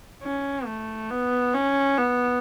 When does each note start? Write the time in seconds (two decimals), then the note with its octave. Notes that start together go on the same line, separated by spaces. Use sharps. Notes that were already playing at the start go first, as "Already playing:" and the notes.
0.22 C#4
0.66 A3
1.11 B3
1.54 C#4
1.98 B3